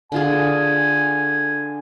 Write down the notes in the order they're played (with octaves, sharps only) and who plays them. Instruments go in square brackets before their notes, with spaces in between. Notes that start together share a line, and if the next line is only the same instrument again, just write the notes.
[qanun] D3 F4 G#4 [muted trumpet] G#5